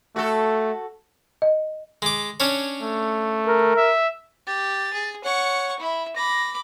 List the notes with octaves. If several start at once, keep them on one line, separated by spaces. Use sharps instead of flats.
A3 F#4 A4
D#5
G#3 D6
C#4 D4 C#5
A3
A#4
E5
G4 A6
G#4
C#5 F#5 C#6
E4 E5 B5
B5 D6 A#6